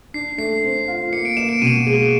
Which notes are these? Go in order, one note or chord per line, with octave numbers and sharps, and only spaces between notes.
D4 C7
A3 C7
C4
F4
A#3 C#7
D7
A#3 E7
D7
B2 D#7
G#3